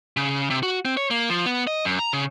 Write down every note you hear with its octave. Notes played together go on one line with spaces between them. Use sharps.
C#3
C3
F#4
C4
C#5
A#3
F3
B3
D#5
F#2
A#5
C#3